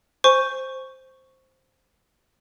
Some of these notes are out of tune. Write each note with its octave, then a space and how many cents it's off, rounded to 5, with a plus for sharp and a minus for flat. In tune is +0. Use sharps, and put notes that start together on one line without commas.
C5 +0 G#5 +0 C#6 +0